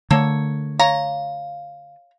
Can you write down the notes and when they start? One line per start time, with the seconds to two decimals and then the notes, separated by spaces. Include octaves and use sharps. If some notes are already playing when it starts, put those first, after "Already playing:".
0.11 D3 A3 A#3 A4 C#5
0.80 C#5 F5 A#5